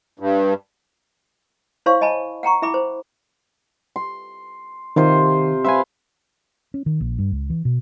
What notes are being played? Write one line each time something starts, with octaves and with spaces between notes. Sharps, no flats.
G2
E4 C5 C#5 F5 C6 C#6
D#5 G#5 A5 B5
F#5 G5 A#5 C#6
E4 E5 G5 B5 D6
C5
C6
C3 D#3 F4 C5
B4 C5 E5 F5 G#5
C#4
D#3
A#1
G2
C#2
E3
B2